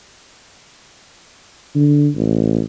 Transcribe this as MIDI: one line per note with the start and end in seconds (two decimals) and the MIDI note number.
1.75 2.09 50
2.16 2.62 33